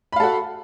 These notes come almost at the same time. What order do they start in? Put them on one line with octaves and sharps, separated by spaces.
B5 F5 A4 F#4